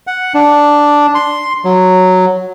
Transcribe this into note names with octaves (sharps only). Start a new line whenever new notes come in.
F#5
D4
C6
F#3